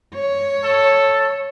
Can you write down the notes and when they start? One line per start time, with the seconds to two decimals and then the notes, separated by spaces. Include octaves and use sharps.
0.14 C#5
0.64 A4